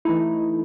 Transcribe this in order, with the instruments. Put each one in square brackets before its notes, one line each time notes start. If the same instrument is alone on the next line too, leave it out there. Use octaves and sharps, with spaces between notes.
[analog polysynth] E3 A3 D#4 [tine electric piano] E4